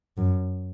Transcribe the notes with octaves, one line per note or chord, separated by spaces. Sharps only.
F#2